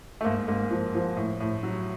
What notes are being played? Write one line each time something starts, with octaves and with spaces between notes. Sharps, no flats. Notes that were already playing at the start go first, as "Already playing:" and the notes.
A3
G#2 A#3
G#2 A#3
F3
F3
A2
A2
F#3